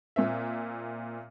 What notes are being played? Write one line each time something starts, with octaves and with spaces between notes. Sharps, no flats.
A#2 C4 E5